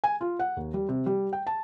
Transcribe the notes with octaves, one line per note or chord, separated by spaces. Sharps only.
G#5
F4
F#5
D#2
G3
C3
G3
G5
A5